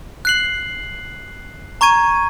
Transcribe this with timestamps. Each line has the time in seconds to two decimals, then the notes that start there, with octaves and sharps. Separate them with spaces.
0.25 F#6 C7 F#7
1.81 A#5 C#6 G#6 D#7